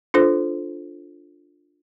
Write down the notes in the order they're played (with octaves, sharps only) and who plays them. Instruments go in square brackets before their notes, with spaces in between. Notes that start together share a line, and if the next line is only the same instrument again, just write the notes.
[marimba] D4 F4 A4 C5